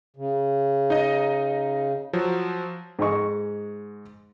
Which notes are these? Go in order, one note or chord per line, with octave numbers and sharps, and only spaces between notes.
C#3
D#4 D#5
F3 F#3
G#2 G#3 D#5 C#6